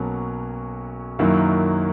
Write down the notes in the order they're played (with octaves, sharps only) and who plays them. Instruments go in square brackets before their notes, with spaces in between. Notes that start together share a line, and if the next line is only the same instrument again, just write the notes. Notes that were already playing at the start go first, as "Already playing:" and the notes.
Already playing: [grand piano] B1 B2 F#3 A#3 C#4
F#2 D#3 F#3 A#3 E4